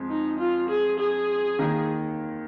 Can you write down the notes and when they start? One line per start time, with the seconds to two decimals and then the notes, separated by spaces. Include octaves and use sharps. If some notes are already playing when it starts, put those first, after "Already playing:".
Already playing: F2 G#3
0.10 D#4
0.39 F4
0.69 G#4
0.99 G#4
1.59 D#2 D#3 A#3 D#4